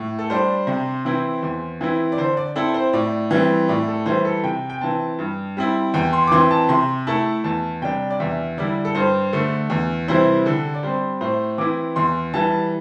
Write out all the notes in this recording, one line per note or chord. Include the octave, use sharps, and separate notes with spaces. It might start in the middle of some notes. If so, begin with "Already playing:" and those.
Already playing: A2
A4
G3 D4 C5
C3
E3 C4 E4
E2
E3 C4 E4
D5
D3 C5
D5
C4 E4 A4
C5
A2 D5
E3 G3 C4
A2 D5
A4
E3 G3 C5
A4
C3 G5
G5
E3 C4 A5
G2
G3 C4 E4
E2 G5
C6
D6
E3 C4 C6
A5
C3 C6
A3 E4 A5
E2 A5
C3 G3 D4 G5
D5
E2 E5
D3 G3 E4 D5
A4
G2 C5
D3 A3
E2
C3 E3 G3 E4 C5
D3 A4
D5
G3 C4 C5
A2 C5
E3 C4 E4 D6
E2 C6
E3 G3 A5